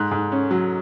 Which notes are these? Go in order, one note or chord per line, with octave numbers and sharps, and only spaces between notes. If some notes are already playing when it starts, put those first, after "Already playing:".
Already playing: G#2 F#6
G#2
C#4
F#3